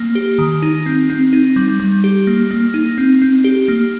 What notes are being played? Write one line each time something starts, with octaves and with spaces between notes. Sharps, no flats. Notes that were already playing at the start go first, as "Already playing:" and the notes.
Already playing: A#3
G4
D#3
D#4
C4
C4
D#4
G3
G3
G4
A#3
A#3
D#4
C4
C4
G4
A#3